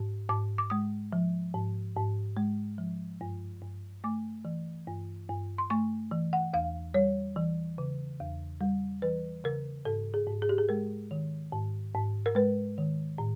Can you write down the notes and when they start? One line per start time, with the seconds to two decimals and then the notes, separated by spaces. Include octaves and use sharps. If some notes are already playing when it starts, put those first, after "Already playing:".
Already playing: G#2
0.29 G#2 D6
0.58 D6
0.70 G#3 D#6
1.13 F3
1.54 G#2
1.96 G#2
2.37 G#3
2.78 F3
3.21 G2
3.62 G2
4.04 A3 D6
4.45 E3
4.87 G2
5.29 G2
5.58 C6
5.70 A3 C#6
6.11 E3
6.33 F#5
6.53 E2 F5
6.94 G3 C#5
7.36 E3
7.78 C#3
8.20 E2
8.61 G3
9.02 E3 B4
9.44 C#3 A#4
9.85 G#2 A4
10.14 G#4
10.27 G#2
10.42 G#4
10.49 G4
10.58 G#4
10.69 G#3 A#4
11.11 D#3
11.52 G#2
11.95 G#2
12.26 A#4
12.35 G#3 B4
12.78 D#3
13.18 A2